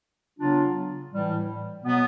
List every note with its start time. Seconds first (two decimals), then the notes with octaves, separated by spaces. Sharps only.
0.39 C#3 F#3 B3 D4 F4
1.11 A2 E3 G3
1.83 B2 F#3 B3